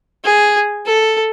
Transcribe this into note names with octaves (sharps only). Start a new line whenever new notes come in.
G#4
A4